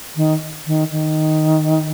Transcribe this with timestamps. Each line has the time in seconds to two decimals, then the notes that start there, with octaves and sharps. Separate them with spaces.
0.16 D#3
0.67 D#3
0.92 D#3